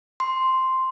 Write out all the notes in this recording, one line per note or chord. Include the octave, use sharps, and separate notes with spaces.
C6